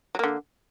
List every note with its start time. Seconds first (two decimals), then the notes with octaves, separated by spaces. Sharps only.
0.15 F#3
0.19 A#3
0.24 D3